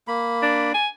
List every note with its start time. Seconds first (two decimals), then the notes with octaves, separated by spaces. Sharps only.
0.08 A#3 B5
0.43 D4
0.74 G#5